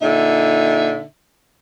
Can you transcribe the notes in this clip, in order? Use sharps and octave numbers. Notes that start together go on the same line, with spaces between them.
A#2 D3 D#4 E5